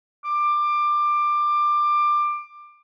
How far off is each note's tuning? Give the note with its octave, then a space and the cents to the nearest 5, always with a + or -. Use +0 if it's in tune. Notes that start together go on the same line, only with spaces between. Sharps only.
D6 +20